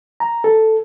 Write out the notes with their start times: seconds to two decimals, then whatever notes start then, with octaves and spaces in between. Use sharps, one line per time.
0.20 A#5
0.44 A4